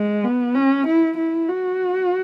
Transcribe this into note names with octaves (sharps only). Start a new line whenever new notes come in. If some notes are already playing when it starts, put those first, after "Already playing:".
Already playing: G#3
B3
C#4
E4
E4
F#4